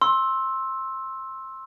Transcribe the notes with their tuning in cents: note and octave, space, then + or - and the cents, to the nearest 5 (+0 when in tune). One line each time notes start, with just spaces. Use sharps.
C6 +20 E6 -5